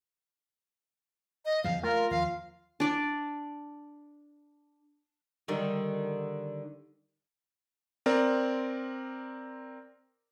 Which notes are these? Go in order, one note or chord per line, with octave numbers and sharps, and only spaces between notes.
D#5
E2 C#3 F3 F5
A3 F4 A#4
D#2 F3 F5
D4 D5
D3 D#3 G3
C4 A#4 D5